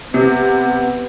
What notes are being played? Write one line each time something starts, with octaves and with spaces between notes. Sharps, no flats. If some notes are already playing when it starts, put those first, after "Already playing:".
C3 B3